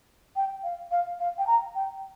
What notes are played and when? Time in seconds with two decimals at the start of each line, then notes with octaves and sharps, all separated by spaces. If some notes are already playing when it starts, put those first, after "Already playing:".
0.36 G5
0.64 F5
0.92 F5
1.20 F5
1.38 G5
1.47 A#5
1.75 G5